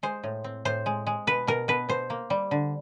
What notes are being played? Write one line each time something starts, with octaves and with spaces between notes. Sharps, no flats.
G#3 C5
A2
C4
A2 C5
G#3
G#3
B2 B4
B2 A#4
B2 B4
B2 C5
A#3
G3
D3